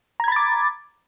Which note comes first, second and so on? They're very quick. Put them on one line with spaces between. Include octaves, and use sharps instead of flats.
A#5 G#6 B5 A6 D6